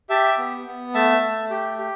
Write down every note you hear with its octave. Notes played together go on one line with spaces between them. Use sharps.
G4 E5 A5
B3
B3
A3 E5 A5
A3
G4
G4